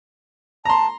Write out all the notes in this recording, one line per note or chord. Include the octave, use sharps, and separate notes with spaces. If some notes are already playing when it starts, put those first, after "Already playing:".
A5 A#5 C6